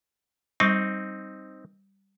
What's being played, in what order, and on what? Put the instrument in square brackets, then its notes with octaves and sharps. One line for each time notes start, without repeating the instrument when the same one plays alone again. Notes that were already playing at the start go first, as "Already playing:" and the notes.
[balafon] G3 C#6 [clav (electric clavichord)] C4 D#4